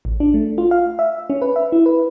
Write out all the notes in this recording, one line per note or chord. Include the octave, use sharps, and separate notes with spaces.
A1
D4
A3
F4
F5
E5
C#4
B4
E5
E4
B4